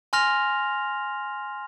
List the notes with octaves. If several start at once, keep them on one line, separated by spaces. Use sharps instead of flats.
G#5 C6 F6 A#6 F7